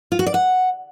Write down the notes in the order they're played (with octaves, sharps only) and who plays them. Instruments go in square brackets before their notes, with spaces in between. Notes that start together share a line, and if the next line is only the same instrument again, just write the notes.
[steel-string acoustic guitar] F4
F#4
D5
F#5